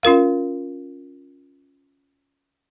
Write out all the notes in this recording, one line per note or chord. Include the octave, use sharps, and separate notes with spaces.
C#4 F4 A#4 F5